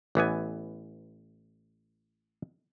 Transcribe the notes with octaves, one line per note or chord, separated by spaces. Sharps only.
A1 E3 B3 G#5